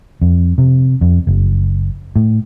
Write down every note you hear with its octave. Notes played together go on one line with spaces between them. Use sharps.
F2
C3
F2
F#1
A2